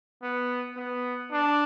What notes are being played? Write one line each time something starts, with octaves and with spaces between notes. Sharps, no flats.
B3
B3
D4